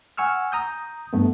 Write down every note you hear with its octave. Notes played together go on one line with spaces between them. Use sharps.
F#5 G#5 C#6 E6 F6
A#5 D#6 G6
G2 A3 B3